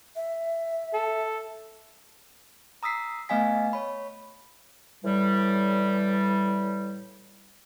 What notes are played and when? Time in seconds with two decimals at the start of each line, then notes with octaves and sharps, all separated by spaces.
0.16 E5
0.94 A4
2.83 A#5 D#6 E6 B6 C7
3.29 A3 B3 D#5 F5 G#5 B6
3.73 C#5 B5
5.04 A2 E3 G3